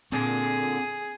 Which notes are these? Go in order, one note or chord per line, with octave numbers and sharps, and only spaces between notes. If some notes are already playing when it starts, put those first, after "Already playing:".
A#2 D3 C4 G#4